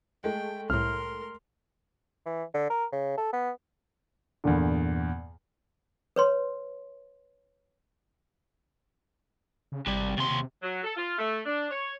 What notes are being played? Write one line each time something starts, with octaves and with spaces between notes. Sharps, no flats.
G#3 A3 G5
C2 A2 A#4 C6 F6
E3
D3
A#4
C#3
A4
B3
E2 G2 A#2 D3
B4 C#5 C6
C#3
G#1 C3 G3
D#2 C3 C6
C3
F#3
A4
F4
A3
D4
C#5